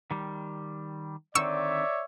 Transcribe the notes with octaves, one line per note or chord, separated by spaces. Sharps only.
D#3 G3
D3 D#3 C4 C#5 D5 E5 C#6 E6